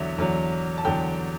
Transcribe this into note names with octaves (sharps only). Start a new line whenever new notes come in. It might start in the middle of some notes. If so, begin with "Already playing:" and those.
Already playing: E2 D3 F#3 E5
E2 D3 F#3
A5
E2 D3 F#3 G5